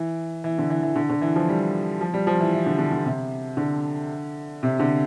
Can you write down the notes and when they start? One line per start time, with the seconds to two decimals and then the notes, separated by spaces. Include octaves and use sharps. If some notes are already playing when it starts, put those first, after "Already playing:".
Already playing: E3
0.44 E3
0.58 D3
0.70 E3
0.83 E3
0.95 D3
1.09 D3
1.21 E3
1.36 F3
1.49 G3
2.01 F3
2.14 G3
2.27 F3
2.40 E3
2.53 E3
2.66 D3
2.79 D3
2.92 D3
3.05 C3
3.57 D3
4.63 C3
4.79 D3